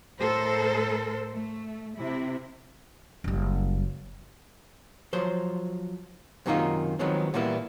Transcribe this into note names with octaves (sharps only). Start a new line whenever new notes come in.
A2 A4 A#4 C5
A3
C3 E4
F#1 G3
F3 F#3 C5
F#2 C3 D#3 A#3 D#4 F4
D#3 F3 F#3 G#3 B3 C4
A#2 E3 G3 A#3 B3 E4